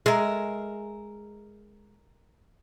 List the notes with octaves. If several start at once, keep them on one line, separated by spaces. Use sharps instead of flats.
G#3 A#4 E5